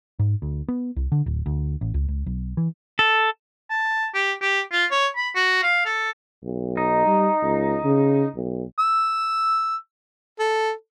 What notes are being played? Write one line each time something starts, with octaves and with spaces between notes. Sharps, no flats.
G#2
D2
B3
C2
D3
D1
D2
A1
C#2
C#2
B1
E3
A4
A5
G4
G4
F4
C#5
B5
F#4
F5
A4
B1
D#4
G3
C#2
C#3
B1
E6
A4